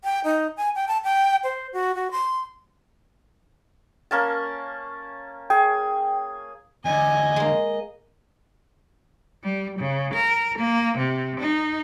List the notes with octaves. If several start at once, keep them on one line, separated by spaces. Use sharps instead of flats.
G5
D#4
G#5
G5
A5
G5
C5
F#4
F#4
C6
A#3 C#4 A5
G#4 G5
E2 D3 D#5 G#5
G#3 A#3
G3
C#3
A#4
A#3
C3
D#4